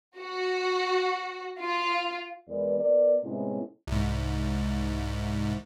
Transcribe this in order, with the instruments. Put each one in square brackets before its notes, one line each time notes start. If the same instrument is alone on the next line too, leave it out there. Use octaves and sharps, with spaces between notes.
[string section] F#4
F4
[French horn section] E2 G#3 A#4 B4 D5
B3 A#4 B4 D5
A2 C3 G#3 B3 C#4 E4
[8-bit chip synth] C2 G#2